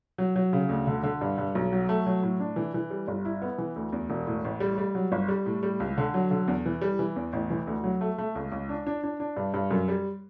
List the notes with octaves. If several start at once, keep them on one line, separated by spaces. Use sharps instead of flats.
F#3
F#3
C#3
D2
D3
D3
G2
G2
B1
F#3
A3
F#3
A2
D4
E3
E3
G3
G1
E4
B3
E3
D2
E2
E1
A2
A1
G3
G3
F#3
G1
G3
A2
G3
C#2
D3
F#3
D3
E2
E3
G3
E3
E2
A1
E3
D2
F#3
A3
A3
C#2
C#2
D4
D4
D4
D4
G2
G2
F#2
G3